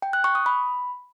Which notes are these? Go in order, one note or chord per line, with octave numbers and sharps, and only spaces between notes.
G5
F#6
C#6
D#6
B5